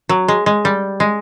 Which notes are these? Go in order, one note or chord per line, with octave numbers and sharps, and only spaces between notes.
F#3
G#3
G#3
G3
G#3